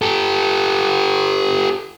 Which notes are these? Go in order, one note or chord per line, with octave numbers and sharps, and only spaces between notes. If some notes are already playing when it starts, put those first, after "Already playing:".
G4 A4